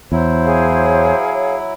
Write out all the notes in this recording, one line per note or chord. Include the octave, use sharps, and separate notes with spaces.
E2 F#3 E4 C5
G#4 C#5 F5